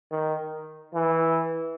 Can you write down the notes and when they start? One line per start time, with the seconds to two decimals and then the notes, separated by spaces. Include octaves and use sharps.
0.11 D#3
0.93 E3